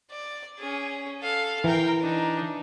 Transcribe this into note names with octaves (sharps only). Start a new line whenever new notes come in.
D5
C#4 G#4
A4 F5
E3 A#4 G5
D4 D#4